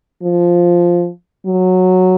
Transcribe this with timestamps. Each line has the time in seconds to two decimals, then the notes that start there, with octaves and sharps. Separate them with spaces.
0.23 F3
1.46 F#3